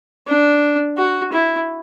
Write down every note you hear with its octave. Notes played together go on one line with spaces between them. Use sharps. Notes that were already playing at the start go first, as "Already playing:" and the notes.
D4
F#4
E4